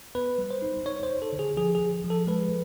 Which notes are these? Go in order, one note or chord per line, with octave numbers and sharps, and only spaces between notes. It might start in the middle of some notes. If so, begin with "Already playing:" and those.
B3 B4
G3
C5
D#4
D#4 C#5
C5
D#4
A4
D3
G#4
F3 G#4
F3 G#4
F3
A4
G#3 B4